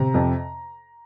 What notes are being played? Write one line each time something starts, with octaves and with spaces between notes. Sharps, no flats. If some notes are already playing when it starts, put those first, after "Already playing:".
Already playing: C3 A#5
F2